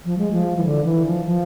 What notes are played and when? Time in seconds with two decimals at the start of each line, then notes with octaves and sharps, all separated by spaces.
0.05 F3
0.18 G#3
0.33 F3
0.57 E3
0.64 D3
0.85 E3
1.05 F3
1.25 F3